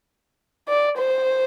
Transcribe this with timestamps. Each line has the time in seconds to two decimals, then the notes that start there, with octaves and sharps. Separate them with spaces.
0.69 D5
0.98 C5